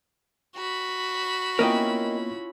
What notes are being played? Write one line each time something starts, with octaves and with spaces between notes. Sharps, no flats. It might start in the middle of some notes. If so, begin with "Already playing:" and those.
F#4 B5
A#3 B3 C#4 E4 F4 A#4 D#5 G5